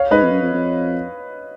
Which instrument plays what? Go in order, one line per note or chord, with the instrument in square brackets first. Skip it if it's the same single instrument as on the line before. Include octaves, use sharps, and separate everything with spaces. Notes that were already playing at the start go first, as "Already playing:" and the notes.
Already playing: [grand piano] C#5 F5
[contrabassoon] G#2 [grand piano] B4 D#5
[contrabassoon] F2
F#2
F2
F2